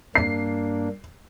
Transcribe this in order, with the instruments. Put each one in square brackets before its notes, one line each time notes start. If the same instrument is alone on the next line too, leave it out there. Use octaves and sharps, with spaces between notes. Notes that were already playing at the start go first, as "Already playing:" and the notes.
[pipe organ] G2 A#3 D4 [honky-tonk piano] C7